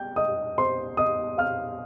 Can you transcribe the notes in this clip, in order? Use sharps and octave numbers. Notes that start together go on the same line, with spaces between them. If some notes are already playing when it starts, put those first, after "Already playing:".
Already playing: G5 G6
D#5 D#6
C5 C6
D#5 D#6
F5 F6